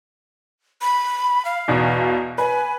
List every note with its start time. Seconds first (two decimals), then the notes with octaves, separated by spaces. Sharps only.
0.81 B5
1.45 F5
1.68 E2 B2
2.38 B4 G#5